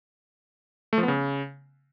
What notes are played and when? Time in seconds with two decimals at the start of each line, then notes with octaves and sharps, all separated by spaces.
0.93 A3
0.98 F3
1.03 B3
1.08 C#3